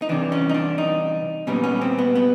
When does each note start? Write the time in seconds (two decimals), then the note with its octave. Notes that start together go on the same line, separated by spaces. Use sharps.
0.02 D#4
0.09 C2 C3 E3 D4
0.32 C#4
0.49 D#4
0.54 D4
0.78 D#4
1.47 A#2 G3 B3 C#4
1.64 C#4
1.81 C4
1.98 B3
2.15 B3